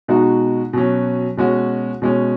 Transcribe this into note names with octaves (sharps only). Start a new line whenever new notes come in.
B2 G#3 D#4 F#4
B2 F#3 C#4
B2 G#3 C#4 F#4
B2 G#3 C#4